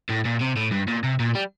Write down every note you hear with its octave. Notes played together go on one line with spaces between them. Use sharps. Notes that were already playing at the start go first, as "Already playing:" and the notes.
A2
A#2
C3
A2
G2
A#2
C3
A#2
G3